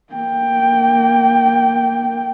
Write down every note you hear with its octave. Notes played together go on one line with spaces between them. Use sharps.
A#3 G5